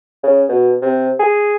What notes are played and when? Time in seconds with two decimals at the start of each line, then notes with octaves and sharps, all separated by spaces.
0.23 C#3
0.49 B2
0.82 C3
1.19 G#4